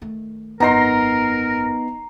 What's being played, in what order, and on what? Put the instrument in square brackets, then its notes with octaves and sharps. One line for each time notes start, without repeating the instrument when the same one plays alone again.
[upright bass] D#3 A3
[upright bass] G#1 F#2 [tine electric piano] B3 D#4 [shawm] A#4 [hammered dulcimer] A#5 C6